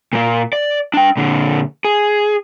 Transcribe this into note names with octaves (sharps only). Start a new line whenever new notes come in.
A#2 A#3
D5
D4 G5
A#2 D3
G#4